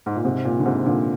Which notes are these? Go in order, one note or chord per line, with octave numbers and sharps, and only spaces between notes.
G#2
A#2
G#2 C3
A#2
D3
G#2 C3
A#2 D3